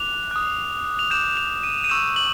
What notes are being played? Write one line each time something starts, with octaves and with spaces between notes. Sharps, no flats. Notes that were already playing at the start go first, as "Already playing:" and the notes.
Already playing: D6 F#6 F7
D#6 F#6
F7
D6 G6 E7
E7
F7
D#7
D#7
C#6 E6 G6 E7
F#7